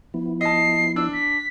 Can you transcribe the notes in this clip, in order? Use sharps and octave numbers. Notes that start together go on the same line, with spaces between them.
F3 B3 E4
D#5 A5 C7
D4 E6
B6